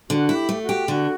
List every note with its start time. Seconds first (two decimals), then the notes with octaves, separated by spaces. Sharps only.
0.09 D3 F#4
0.29 E4
0.35 G4
0.49 A3
0.63 F#4
0.69 G4
0.88 D3 F#4